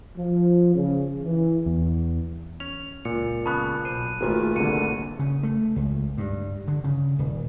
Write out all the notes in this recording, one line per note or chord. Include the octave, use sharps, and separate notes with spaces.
F3
C#3
E3
E2
C#4 F7
C#2 A#2 C#7
C#3 B3 A5 B5 F#6
B1 C5 D#7
G#1 A#2 A3 A#3 F4 G4 B4 G#5
C2 D3 C#7 D#7
C#3
A3
C#2
G2
D3
C#3
D#1